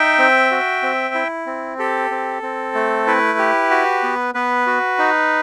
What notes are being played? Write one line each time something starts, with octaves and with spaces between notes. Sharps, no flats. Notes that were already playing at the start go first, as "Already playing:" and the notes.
Already playing: D#4 E5 G5
C4
F#4
C4
E4
C4
G4 A4
C4
C4
A3
E4 B4
G4
F#4
B3
B3 B4
F#4
D#4